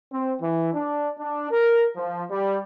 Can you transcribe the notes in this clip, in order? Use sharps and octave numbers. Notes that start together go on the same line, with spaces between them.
C4
E3
D4
D4
A#4
F3
G3